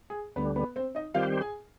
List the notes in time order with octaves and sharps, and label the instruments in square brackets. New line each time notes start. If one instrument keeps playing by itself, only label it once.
[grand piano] G#4
[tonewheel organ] D2 D3 G3 [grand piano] B3 B4
[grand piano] B3 B4
C4 C5
D#4 D#5
[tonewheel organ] D#3 G3 C4 G4 C5 [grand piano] F4 F5
[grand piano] G#4 G#5